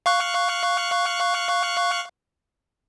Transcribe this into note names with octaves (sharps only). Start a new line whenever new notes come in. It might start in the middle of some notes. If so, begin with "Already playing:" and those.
F5 C#6 F#6